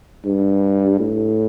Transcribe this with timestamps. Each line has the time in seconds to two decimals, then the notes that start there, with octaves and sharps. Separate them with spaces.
0.25 G2
0.99 A2